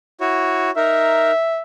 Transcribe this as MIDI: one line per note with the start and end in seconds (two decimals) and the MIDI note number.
0.21 0.71 64
0.21 0.71 66
0.21 0.71 73
0.76 1.31 63
0.76 1.31 70
0.76 1.63 76